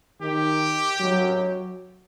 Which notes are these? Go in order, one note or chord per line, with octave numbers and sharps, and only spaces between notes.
D#3 G4
F#3